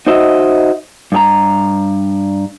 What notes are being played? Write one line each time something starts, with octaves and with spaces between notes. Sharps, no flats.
D#4 F#4 C5 D#5 E5
G2 G#4 A#5